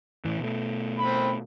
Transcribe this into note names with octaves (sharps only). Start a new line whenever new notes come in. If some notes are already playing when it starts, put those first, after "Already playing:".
A2 E3
B2 A3
C4 B5